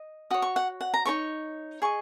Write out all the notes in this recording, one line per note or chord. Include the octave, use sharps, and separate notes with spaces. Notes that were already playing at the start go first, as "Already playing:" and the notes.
Already playing: D#5
F#4 C#5 D#6
C#6
F#5
F#5
A#5
D#4 A#4 C#5 C#6
G#4 D#5 C#6